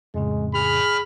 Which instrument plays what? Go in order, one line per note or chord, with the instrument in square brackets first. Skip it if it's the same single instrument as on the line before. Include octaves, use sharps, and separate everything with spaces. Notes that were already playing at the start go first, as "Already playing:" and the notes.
[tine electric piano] F2 A2 C#3 [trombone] G#3
[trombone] G#4 [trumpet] B5 [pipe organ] F6